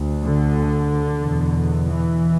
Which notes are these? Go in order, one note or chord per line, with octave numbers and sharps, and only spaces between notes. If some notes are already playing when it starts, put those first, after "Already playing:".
Already playing: D2
D3
E2 B2
E3